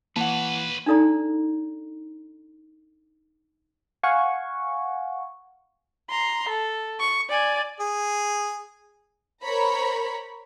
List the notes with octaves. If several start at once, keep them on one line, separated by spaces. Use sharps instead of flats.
E3 A#3 B4 C#5 F#5 A5
D4 D#4 A4 D5 A#5
F5 F#5 G#5 C#6
A#5 C6
A4
C#6
D5 G#5
G#4
A#4 C5 C#5 A#5 B5